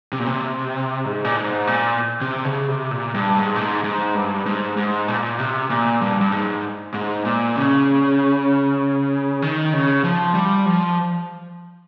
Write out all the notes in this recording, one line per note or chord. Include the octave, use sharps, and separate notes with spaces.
C3
A#2
C3
G#2
A#2
G#2
A#2
C3
C#3
C3
A#2
G2
G#2
A#2
G#2
G#2
G2
G#2
G#2
A#2
C3
A#2
G2
G2
G#2
G#2
A#2
C#3
D#3
C#3
F3
G3
F3